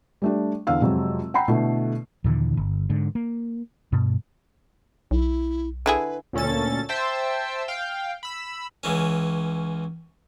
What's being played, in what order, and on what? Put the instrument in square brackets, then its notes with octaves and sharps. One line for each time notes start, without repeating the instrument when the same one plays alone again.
[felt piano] G3 A3 D4
E2 D3 F5 E6
F2 C3 F#3 G#3
F#5 G5 A#5 B5 C7
B2 D3 A3 E4 A4
[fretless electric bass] D#2 A#2 D3 E3
G1
G#2 D3
A#3
G2 B2
[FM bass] B1 [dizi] E4
[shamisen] D3 E4 G#4 [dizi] B4
[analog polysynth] D2 A#2 C#4 A4 A6
C5 E5 G5 A5 E6
F5 G5
B5 E6
[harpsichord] C#2 E3 C#4